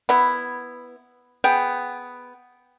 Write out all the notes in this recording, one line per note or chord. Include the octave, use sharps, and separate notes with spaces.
B3 E4
B3 G#4 G5